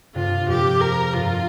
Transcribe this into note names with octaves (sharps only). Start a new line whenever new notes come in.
G2 C3 F4
F2 A#2 G4
A#4
G2 C3 F4